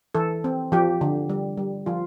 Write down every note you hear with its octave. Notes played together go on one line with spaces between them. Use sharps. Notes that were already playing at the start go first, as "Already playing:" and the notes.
E3 A4
C4
F3 G4
D3
G3
G3
F3 F4